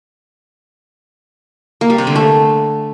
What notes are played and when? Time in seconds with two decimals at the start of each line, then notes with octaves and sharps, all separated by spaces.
1.81 A#3
1.90 G3
1.98 C3
2.07 D3
2.16 A3